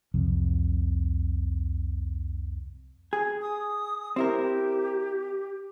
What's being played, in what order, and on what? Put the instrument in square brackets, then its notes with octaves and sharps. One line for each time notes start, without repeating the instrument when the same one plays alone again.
[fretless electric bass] C2 F2 C3 F3
[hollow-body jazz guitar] G#4
[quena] D#6
[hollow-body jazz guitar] C4 E4 A#4 [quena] G4